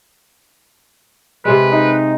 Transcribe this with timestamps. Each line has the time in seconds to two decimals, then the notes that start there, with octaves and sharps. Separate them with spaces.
1.45 C3 G#3 B4
1.72 D#4